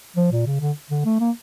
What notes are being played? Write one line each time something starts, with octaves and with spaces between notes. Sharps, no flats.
F3
A#2
C#3
D3
D3
A3
A#3